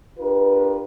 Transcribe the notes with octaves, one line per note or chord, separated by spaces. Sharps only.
D4 F4 G4 A#4 B4